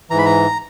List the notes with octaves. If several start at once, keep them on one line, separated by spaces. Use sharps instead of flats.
G#2 E3 A#5
B5
A#5